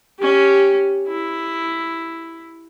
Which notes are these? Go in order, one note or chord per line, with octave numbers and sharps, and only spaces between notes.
C#4 G4
E4